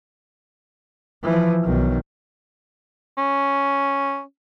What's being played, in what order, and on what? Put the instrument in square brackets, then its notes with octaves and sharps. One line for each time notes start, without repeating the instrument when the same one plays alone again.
[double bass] E3 F3
B1 D#3
[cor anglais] C#4